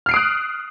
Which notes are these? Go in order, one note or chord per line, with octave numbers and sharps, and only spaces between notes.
D#6 F6 F#6 C7 D7